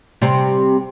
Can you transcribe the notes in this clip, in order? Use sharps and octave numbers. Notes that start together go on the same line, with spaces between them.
C3 G3 C4